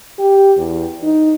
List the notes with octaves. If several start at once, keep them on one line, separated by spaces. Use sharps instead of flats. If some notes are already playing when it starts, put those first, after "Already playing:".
G4
E2
D#4